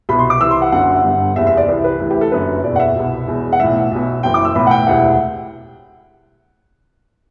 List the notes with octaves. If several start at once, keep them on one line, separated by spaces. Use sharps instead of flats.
C2 B2 B5
C6
D6
C2 C3 E3 E6
C6
F#5
F#1 F#2 D3 F#5
G1 G2 D3
F#1 E2 C3 E5
E5
D5
C2 C3 E3
B4
D2 C3 E3
G4
A4
F#1 F#2 D3 B4
F#1 E2 B2 D5
F#5
E5
C2 B2
E1 E2 B2
F#5
B1 A2 E3 E5
B1 B2
F#1 F#2 E3 G5
D6
E6
B1 A2 E3 B5
F#5
G5
E1 D2 C3 E3 F#5